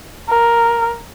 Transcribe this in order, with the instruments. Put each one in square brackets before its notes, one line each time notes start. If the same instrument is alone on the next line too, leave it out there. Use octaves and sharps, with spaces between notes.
[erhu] A#4